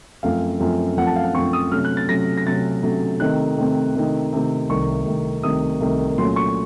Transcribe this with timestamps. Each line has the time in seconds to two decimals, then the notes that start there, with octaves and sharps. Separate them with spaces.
0.23 F#2 F3 A3 C4 F5
0.60 F#2 F3 A3 C4
0.97 F#2 F3 A3 C4 F#5
1.06 A5
1.16 F5
1.25 F#5
1.34 F#2 F3 A3 C4 C#6
1.53 D#6
1.72 C3 F#3 A3 C#4 F6
1.85 F#6
1.97 A6
2.08 C3 F#3 A3 C#4 A#6
2.38 A#6
2.46 C3 F#3 A3 C#4 A6
2.83 C3 F#3 A3 C#4
3.20 C3 D#3 A3 C4 D#4 F#6
3.57 C3 D#3 A3 C4 D#4
3.95 C3 D#3 A3 C4 D#4
4.33 C3 D#3 A3 C4 D#4
4.69 C2 C3 D#3 A3 C#6
5.06 C2 C3 D#3 A3
5.43 C2 C3 D#3 A3 D#6
5.80 C2 C3 D#3 A3
6.18 A#2 F#3 A3 C#4 C6
6.36 C#6